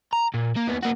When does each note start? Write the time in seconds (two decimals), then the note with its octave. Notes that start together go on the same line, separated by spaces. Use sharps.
0.13 A#5
0.34 A#2
0.56 A#3
0.67 D#2 B3
0.82 A#3 F#4